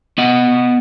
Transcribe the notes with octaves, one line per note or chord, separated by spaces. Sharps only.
B3 D#5 F#5